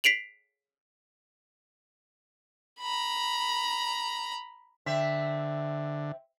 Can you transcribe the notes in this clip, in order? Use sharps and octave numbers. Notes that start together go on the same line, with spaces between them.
B6 C7 D7 F7 F#7
A#5 B5
D3 C4 E5